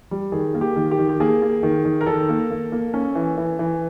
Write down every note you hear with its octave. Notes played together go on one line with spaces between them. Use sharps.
G3
D#3 G#4
A#3
G4
D#3
G4
D#3
G4
A#3 G#4
A#3
D#3
D#3
A#4
D#3 A4
A#3
A#3
A#3
C#4
E3
E3
E3